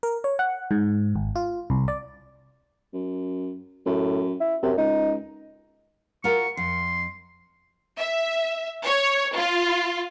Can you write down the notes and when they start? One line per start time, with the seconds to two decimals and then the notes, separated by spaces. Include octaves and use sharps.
0.03 A#4
0.24 C#5
0.39 F#5
0.71 G#2
1.16 G#1
1.36 F4
1.70 C2
1.88 D5
2.93 F#2
3.86 F#2 A2
4.41 E4
4.63 F#2 C3
4.78 C#2 D#4
6.24 F4 F#4 A#4 C#6
6.57 F2 C6
7.98 E5
8.85 C#5
9.36 F4